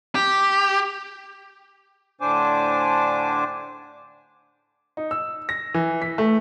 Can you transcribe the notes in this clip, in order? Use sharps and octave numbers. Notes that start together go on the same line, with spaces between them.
G4
A2 D3 D4 C5 G#5 D6
D#4
E6
A#6
E3
B6
A3